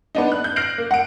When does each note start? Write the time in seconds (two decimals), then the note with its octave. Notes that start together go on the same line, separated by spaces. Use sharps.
0.15 B3 D4 D#4
0.32 F#6
0.44 G6
0.56 F6 F#6 A#6 C7 D7 F#7
0.78 A#3
0.91 F#5 D7